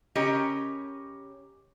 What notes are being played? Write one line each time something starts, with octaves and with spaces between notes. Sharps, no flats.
C#3 C#4 G4 A#4 C#5 D#5